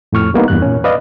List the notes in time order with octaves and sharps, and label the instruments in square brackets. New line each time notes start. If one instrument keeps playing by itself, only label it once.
[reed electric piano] F2 A2 C#6 F6
G3 A#3 B3 D#4
E2 G2 F#6
A#2 C#4
B4 D5 D#5 F5